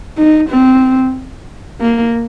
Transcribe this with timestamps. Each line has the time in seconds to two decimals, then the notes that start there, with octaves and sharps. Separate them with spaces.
0.17 D#4
0.50 C4
1.81 A#3